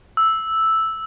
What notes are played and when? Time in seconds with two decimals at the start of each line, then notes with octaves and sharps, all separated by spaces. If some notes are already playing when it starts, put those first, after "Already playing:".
0.17 E6